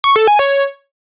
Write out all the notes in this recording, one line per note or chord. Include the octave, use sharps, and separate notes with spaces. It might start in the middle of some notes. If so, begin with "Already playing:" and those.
C#6
A4
G#5
C#5